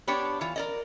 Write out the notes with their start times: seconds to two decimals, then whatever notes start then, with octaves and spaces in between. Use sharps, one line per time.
0.07 B3 D4 G4 C#5
0.41 E3 F4
0.56 A#4 D5 D#5